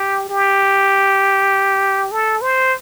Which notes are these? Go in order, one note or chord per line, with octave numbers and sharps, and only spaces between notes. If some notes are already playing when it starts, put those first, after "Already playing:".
Already playing: G4
G4
A4
C5